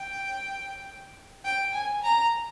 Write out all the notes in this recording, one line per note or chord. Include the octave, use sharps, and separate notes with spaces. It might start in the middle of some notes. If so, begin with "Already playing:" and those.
Already playing: G5
G5
G#5
A#5